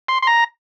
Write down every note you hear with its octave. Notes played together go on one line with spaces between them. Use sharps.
C6
C6
A#5